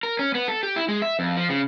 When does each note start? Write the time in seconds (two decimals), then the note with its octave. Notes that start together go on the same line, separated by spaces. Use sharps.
0.03 A#4
0.19 C#4
0.35 B3
0.48 A4
0.63 G4
0.76 E4
0.88 G#3
1.02 E5
1.19 F2
1.37 F3
1.49 C#3